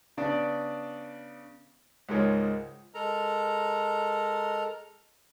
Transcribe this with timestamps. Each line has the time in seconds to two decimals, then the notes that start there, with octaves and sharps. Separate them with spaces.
0.17 C#3 B3 D4 D5
2.09 C#2 G#2 G#3 A#4 C#5
2.94 G#3 A4 A#4 A#5